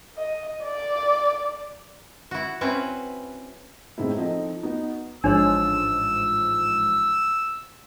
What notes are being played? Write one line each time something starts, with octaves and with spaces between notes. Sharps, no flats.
D#5
D5
E4 F#4
C4 C#4 E4 B4
A2 G#3 B3 C4 D#4 E4
F3 C4 D#4 A4 D#5
B3 D#4 F#4
A1 G#2 F3 D4 G#4 C#5 E6